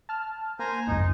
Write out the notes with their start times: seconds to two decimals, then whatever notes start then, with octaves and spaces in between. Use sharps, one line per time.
0.09 A5 F6
0.59 A#3 C5 G#5 A#5
0.87 G#1 C#2 F#2 D#4